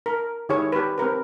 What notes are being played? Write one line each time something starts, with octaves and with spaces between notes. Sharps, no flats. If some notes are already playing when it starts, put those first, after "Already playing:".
A#4
D#3 E4 G4 G#4 C#5
G4 B4
C4 G4 A#4 B4